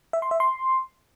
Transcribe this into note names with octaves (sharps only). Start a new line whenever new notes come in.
E5
C6
E5
C6